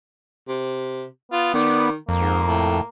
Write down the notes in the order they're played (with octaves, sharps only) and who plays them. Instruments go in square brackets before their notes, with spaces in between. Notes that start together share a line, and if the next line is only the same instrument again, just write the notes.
[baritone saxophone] C3
[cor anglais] B3 [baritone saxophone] F4
[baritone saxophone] D#3 [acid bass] B3 [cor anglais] D5
[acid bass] F2 [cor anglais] A#3
[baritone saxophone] G#2
A2